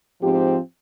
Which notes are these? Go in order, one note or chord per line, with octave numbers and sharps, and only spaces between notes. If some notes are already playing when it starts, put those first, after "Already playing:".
G#2 F3 C4 G4